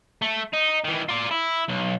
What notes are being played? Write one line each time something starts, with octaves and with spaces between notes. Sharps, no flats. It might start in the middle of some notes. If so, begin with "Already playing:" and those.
A3
D#4
D#3 E3
F4 D5
E4
B1